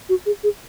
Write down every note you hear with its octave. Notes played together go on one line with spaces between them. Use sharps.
F#4
G#4
G#4